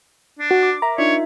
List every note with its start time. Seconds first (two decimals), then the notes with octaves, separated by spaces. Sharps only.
0.39 D4
0.51 F#4
0.63 D6
0.82 A#4 E5 A#5
0.98 D4 D#4 F4 C#5 E5